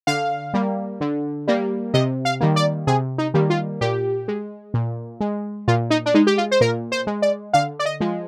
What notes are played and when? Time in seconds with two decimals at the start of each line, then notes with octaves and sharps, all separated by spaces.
0.07 D3 F5
0.54 G3 A#3
1.01 D3
1.48 G3 A#3
1.94 C3 D#5
2.25 F5
2.40 D#3 G3 A#3
2.56 D5
2.87 C3 G#4
3.18 D#4
3.34 D#3 G3 A#3
3.50 F4
3.81 A#2 G4
4.28 G#3
4.74 A#2
5.20 G#3
5.68 A#2 F4
5.90 D#4
6.06 D4
6.14 G#3 D#4
6.27 G4
6.38 F4
6.51 C5
6.61 A#2 A#4
6.92 C5
7.07 G#3
7.22 D5
7.53 D3 F5
7.79 D5
7.86 D#5
8.00 F3 G#3